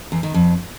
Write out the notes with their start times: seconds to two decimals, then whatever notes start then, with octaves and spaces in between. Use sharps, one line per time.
0.12 E2
0.23 D#3
0.34 F2